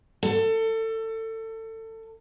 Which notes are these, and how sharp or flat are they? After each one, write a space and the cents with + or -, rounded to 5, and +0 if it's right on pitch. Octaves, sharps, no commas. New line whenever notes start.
A4 +25